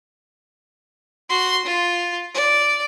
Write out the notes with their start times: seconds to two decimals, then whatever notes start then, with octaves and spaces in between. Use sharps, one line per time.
1.29 F#4 C6
1.65 F4
2.34 D5